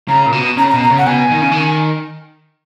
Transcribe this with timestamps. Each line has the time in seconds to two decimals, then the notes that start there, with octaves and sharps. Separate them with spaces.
0.08 C#3 A#5
0.26 A#2
0.32 B2
0.57 C#3 A#5
0.70 A#5
0.73 B2
0.82 A#5
0.90 C#3
0.98 F#5
1.06 B2 G#5
1.31 D#3
1.41 C#3
1.51 D#3